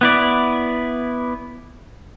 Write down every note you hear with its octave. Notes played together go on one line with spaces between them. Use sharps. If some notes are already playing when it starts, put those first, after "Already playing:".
B3 E4 D5